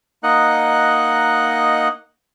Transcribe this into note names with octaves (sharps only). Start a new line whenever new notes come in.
A#3 D#4 D#5 F#5 F#6